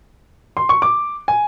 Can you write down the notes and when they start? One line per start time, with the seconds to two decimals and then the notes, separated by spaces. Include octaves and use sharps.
0.57 C6
0.69 C#6
0.82 D6
1.28 G#5